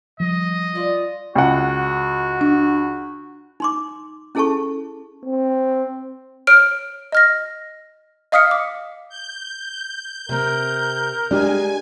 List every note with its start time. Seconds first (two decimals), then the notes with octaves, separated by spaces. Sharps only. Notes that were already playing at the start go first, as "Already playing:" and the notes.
0.20 F3 G3 D#5
0.75 F4 D5
1.35 C#2 F#4 F#5
2.41 D4
3.60 D#4 C6 D6
4.35 C#4 E4 G#4 A4 A5 C#6
5.25 C4
6.47 C#5 F6 D7
7.12 D#5 F6 A#6
8.32 D#5 F5 D#6 F6 B6 C#7
8.51 D6
9.09 G6
10.29 C3 C4 A#4
11.31 G#3 D4 G4 G#5